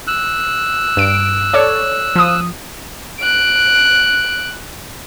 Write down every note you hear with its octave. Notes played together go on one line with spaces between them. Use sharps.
E6 F#6
G2 D7
A4 C#5 D5
F3 D#6
F#6 D7